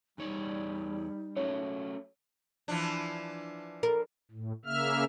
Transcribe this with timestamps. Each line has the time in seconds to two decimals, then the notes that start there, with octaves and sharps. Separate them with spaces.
0.18 E2 G3 D#4 C#5 D5
1.36 F#3 A3 C#4 C#5
2.68 E3 F3 D4
3.83 A#4
4.31 A2
4.65 C#3 A#3 E5 F6